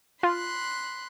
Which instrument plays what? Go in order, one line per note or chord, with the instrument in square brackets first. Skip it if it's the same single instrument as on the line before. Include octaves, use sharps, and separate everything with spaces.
[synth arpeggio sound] F4 [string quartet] B5 C6 F#6